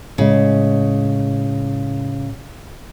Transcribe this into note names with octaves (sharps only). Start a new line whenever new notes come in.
A2 C#3 G#3